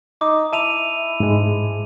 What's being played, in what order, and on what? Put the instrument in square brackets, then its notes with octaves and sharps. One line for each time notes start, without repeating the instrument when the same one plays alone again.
[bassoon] D#4 [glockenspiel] D6
[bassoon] E4 [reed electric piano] E5 [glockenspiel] A5 D#7 F7
[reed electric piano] G#2 G#3